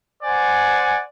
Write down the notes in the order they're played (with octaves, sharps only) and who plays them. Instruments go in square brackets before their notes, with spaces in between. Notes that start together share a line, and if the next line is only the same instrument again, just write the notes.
[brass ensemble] C5 D5 F#5 G#5